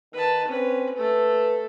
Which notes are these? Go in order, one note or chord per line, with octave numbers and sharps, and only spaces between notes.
D#3 B4 A5
C4 C#4 B4
A3 A4 B4